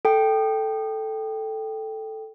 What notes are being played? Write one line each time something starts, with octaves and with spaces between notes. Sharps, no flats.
A4 G5